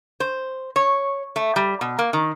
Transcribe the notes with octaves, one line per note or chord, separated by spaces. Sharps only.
C5
C#5
A3
G3
B2
A#3
D#3